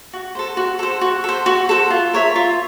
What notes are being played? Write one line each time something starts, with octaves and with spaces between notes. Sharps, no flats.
F#4
A4 C5
F#4
A4 C5
F#4
A4 C5
F#4
A4 C5
F4
A#4 C#5 E5
F4